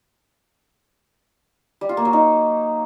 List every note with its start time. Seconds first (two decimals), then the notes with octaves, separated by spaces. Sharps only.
1.81 G3
1.89 F4
1.97 A#3
2.05 F#3
2.13 D#4